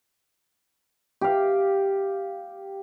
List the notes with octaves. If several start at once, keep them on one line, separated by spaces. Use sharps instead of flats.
G4 F5